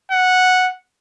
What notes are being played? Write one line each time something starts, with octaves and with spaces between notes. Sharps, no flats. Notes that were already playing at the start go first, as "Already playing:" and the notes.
F#5